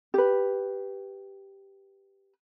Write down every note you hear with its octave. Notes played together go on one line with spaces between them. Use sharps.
G4 B4